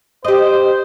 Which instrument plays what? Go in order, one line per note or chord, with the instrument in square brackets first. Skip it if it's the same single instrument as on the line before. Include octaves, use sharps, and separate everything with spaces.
[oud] G4 D#5 [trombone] C5